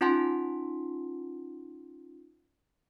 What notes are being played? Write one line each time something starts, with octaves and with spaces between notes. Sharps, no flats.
C#4 D#4 F4 F#5 A5 C6